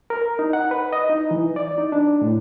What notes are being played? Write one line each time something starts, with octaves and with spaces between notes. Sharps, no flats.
A#4
D#4
F#5
B4
D#5
D#4
E3
D5
D#4
D4
A2